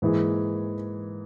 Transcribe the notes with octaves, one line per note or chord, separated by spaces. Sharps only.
G#2 E3 A#3 E4 G#4